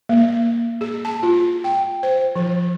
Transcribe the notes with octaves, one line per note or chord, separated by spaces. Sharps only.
A#3
G#4
A5
F4
G5
C5
F3